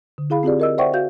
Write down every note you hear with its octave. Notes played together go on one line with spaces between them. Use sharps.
D3
E4 G#4 F5 B5
C4 F4 G4 G#4 D5
A#4 D#5 E6
C5 D5 E5 F#5 G5 C#6
F#4 F5 G6